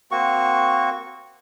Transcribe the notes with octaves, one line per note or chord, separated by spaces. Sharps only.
A#3 C4 F#4 C#6